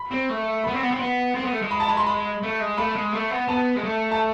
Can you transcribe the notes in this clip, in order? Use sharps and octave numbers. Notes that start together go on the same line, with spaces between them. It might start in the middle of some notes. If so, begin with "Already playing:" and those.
Already playing: B5
C4
A3
B3 B5
C4
B3
C4
B3
C4
B3
A3
G#3
B5
A5
B5
C6
B5
A3
G#3
A3 B5
G#3
A3
B3
B3 A5
G#3
A3
A5